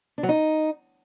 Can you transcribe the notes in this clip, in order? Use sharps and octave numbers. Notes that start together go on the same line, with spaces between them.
D4
F#3
D#4